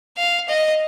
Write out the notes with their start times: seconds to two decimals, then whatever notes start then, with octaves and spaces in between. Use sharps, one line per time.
0.17 F5
0.49 D#5